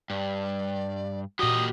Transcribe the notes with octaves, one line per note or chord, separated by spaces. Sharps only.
G2 D5
A#2 F#3 F#4 G4 D#5 D#6